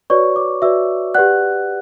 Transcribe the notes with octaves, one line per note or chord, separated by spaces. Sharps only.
F#4 B4 C#5 D5 C#6
D5 D6
F#4 B4 D5 E5 E6
G4 B4 D5 F#5 F#6